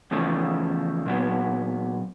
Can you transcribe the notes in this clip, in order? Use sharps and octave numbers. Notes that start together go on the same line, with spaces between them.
E2 C#3 F3 A3
A#2 F#3 B3